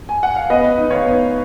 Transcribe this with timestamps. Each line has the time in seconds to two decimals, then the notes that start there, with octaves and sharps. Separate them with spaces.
0.09 G#5
0.23 F#5
0.36 F5
0.50 B3 B4 D#5
0.78 D#4
0.90 C#5 F5
1.05 B3